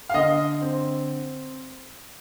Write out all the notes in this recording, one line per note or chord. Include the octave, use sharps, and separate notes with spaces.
F5
D3 D#5
C4